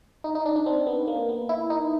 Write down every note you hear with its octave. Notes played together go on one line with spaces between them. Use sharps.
D#4
D#4
D4
D4
C4
B3
A#3
B3
E4
D#4